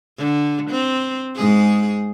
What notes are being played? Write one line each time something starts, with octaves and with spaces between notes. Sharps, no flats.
D3
C4
G#2 G#4